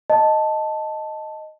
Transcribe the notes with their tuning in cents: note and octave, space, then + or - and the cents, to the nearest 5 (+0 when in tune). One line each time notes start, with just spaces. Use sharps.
D#5 +0 A5 +0